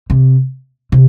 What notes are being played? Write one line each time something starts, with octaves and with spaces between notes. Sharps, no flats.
C3
C3